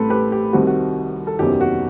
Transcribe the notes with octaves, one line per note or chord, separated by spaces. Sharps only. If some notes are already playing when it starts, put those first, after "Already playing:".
Already playing: A1 A2 G3 C4 G4 A4 B4 C5
G4 B4
G4
C2 C3 D#3 G3 C4 F#4
F#4
A4
F#1 E2 C3 D#3 F#3 G4
F#4